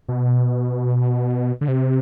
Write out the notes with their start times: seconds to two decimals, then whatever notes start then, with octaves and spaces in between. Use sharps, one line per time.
0.09 B2
1.61 D3
1.68 C3